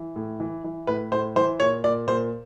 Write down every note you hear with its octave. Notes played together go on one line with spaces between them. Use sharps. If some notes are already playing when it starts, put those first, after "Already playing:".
Already playing: E3
A2
E3
E3
A2 B4
A2 C5
E3 C5
A#2 C#5
A#2 D5
A#2 C5